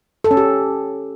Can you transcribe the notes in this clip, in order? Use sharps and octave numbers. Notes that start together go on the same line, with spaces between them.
A4
C#4
G4